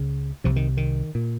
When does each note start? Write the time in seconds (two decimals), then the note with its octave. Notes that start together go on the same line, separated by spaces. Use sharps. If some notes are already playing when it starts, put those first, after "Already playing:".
Already playing: C#2 C#3
0.44 C2 C3 F3
0.56 D#3
0.77 D#3
1.15 A#2